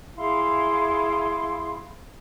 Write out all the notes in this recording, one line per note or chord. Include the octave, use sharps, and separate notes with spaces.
E4 G#4 F5 C6